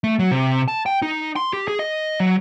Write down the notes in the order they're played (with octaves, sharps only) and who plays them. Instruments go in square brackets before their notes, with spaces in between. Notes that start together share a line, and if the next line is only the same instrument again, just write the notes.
[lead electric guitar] A3
F#3
C3
A5
G5
D#4
C6
G4
G#4
D#5
F#3